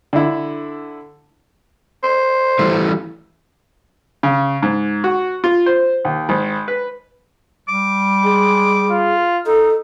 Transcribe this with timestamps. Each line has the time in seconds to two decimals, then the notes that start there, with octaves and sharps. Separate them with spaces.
0.13 D3 E4
2.03 C5
2.59 E3 G3 A3
4.23 C#3
4.63 G#2
5.04 F#4
5.44 F4
5.66 C5
6.05 D#2
6.29 G#1
6.68 B4
7.69 G3 D6
8.24 G#3 G#4
8.90 F4
9.46 D#4 A4